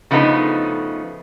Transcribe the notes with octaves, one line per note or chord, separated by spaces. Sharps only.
C#3 F3 A3 B3 D#4